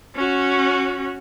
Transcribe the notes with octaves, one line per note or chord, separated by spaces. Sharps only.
C#4 F#4